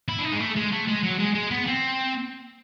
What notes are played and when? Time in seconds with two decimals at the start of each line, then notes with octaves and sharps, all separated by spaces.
0.08 E4
0.19 D4
0.25 D#4
0.33 G#3
0.40 A3
0.56 G#3
0.72 A3
0.88 G#3
1.04 F#3
1.19 G#3
1.35 G#3
1.51 B3
1.67 C4